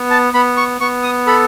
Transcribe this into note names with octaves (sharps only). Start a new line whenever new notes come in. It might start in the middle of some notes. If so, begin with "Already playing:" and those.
Already playing: B3
A5
B3 B5
C#6
B3 C#6
D#6
A4 B5